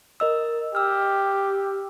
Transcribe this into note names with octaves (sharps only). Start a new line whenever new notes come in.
A#4 D#5 E6
G4 E6 F6